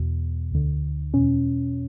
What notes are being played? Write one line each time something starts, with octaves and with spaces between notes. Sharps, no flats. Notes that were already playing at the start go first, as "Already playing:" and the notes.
Already playing: E2 B2
D2 D3
E2 B2 C#4